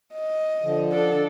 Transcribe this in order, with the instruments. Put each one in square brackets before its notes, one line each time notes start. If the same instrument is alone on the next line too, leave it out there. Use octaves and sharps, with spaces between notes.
[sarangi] D#5
[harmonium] D3 F3
[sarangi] D4 [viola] A4